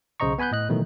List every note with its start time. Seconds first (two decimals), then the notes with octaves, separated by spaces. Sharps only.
0.20 B1 C#3 C5 D#5 A#5 C#6
0.38 B3 G#5 B5 F#6 G6
0.51 A2 D#5 F#6
0.69 B2 D#3 E3 F#3 A3 D#4